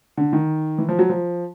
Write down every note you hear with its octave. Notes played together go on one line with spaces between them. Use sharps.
D3
D#3
E3
F3
F#3
F3